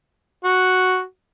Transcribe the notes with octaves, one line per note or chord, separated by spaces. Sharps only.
F#4